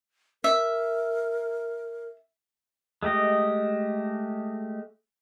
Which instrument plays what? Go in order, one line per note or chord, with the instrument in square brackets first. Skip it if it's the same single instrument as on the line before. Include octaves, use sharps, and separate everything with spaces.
[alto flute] A#4 [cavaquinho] E5
[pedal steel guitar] G#3 A3 G4 D#5